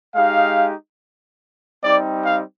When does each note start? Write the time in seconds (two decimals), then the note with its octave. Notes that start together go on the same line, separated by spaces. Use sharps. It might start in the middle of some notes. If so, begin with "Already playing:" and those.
0.15 G#3 D#4 G4 F5
1.84 G3 C4 D#4 G4 D5
2.25 F5